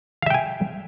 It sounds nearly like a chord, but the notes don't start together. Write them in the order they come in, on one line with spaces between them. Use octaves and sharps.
F5 E5 G5 G#5